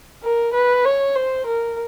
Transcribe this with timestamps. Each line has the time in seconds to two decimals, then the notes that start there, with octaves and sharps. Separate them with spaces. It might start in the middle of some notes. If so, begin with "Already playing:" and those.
0.23 A#4
0.54 B4
0.85 C#5
1.16 C5
1.47 A#4